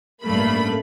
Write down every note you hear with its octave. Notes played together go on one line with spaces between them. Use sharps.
A1 G2 A3 A#3 B5